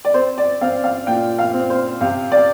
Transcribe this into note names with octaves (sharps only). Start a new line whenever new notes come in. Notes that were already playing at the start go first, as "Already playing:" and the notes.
D5
C4 C5
D5
C4 F5
F5
A#2 G5
F5
C4
C5
C3 F5
D5